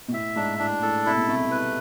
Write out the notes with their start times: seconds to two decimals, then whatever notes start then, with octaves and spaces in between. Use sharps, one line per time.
0.08 B2
0.12 A2 E5
0.36 G#2 D4
0.59 A2 D4
0.82 A2 A4
1.06 C3 E4
1.17 B2
1.28 C2 C3 A3
1.51 B4